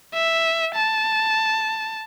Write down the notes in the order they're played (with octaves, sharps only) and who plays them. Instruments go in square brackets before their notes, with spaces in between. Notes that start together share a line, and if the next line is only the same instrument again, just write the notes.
[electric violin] E5
A5